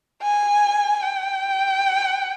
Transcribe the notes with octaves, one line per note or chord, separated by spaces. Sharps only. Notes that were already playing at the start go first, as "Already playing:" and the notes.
G#5
G5